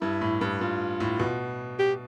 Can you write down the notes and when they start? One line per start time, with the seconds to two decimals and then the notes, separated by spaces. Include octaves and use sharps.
0.01 G2 E4
0.21 A2
0.41 G2
0.61 G2 F4
1.00 A2
1.20 B2
1.79 G4